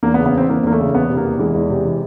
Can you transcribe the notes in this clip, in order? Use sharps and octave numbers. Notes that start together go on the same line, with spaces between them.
E2 A#3
B3
C#3
B3
E2 C4
E3 A#3
E2 A#3
A3
C#3
E2 B3
C3
A#3
E2
E3 G#3
E2
C3
E3